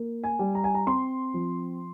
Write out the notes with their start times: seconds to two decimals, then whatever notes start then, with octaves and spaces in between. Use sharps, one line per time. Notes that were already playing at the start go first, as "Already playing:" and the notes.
Already playing: A#3
0.24 G#5
0.39 G3
0.55 A#5
0.64 G#5
0.75 A#5
0.87 C4 C6
1.34 F3